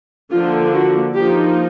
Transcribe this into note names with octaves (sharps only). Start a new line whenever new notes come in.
D3 F3 A#3 D4 F4
F#4
F3 A#3 D#4 G4